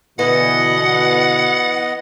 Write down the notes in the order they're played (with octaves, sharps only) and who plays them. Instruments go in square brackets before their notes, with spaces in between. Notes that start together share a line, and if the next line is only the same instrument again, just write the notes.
[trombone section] B2 D3 [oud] E3 [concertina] B3 D#5 [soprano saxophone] F#5